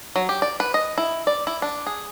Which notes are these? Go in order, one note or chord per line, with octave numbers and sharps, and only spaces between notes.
F#3
G4
D5
B4
D#5
E4
D5
E4
D4
G#4